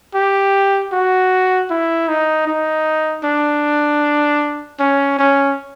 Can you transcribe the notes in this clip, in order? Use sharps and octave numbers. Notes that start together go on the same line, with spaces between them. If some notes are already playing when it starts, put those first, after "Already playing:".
G4
F#4
E4
D#4
D#4
D4
C#4
C#4